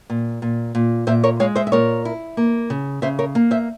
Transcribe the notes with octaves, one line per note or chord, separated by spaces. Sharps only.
A#2
A#2
A#2
A#2 C5 E5
A#4 C#5
G#3 C#5 F5
C5 E5
E5
A#2 A#4 C#5
E4
A#3
C#3
C#3 C5 E5
A#4 C#5
A#3
C5 E5